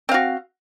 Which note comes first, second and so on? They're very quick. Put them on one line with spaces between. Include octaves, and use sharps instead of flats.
C4 F5 F#4